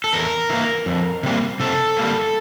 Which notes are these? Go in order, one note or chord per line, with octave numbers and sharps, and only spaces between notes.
A4
E2 A#4
E3 A#3
F2
C3 G3 A#3
C3 A4
G3 A#3